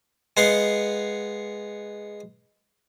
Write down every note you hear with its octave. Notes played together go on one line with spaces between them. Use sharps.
G#3 B3 F5 F#5 C6